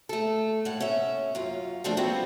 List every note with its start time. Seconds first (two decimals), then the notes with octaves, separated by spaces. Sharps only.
0.09 A3 A4
0.65 A2 F#5
0.80 C#4 E5
1.35 F#2 F4
1.84 D#2 F3 A3 D4
1.97 G3 B3 C4 F4 F#4